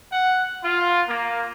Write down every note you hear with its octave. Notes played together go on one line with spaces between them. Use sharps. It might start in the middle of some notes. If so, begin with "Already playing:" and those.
F#5
F4
A#3